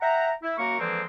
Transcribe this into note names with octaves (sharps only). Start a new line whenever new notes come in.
E5 F#5 G5 A#5
E4
F#2 A#3 F#4 A#4 C#6
D3 E3 F3 G#3 A#3 C4